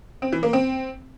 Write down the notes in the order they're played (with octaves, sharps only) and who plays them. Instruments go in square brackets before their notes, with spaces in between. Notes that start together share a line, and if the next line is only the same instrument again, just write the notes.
[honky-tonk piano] C4
E3
A#3
C4